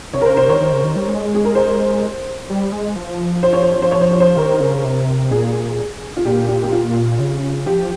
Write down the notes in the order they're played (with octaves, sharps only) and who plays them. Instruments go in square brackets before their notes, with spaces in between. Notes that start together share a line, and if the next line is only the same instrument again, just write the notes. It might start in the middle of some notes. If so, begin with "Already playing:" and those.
[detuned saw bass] C3 [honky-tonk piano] C#5
[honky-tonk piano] A#4
[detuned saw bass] C#3 [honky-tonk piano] C5
[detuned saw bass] C3 [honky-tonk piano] C5
[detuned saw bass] D#3 [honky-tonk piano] C#5
[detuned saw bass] D#3
C#3
D#3
G3
G#3
[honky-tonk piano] G#4
A#4
C5
[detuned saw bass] G3
G#3
F3
[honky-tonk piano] C5
C#5
C5
C#5
C5
C#5
C5
C#5
C5
[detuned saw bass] D#3 [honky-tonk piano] A#4
[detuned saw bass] C#3
C3
[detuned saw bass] A#2 [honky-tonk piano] G#4
[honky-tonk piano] F4
[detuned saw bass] A#2 [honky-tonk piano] G4
[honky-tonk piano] G4
G4
F4
[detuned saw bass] C#3
[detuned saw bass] F3 [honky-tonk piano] G4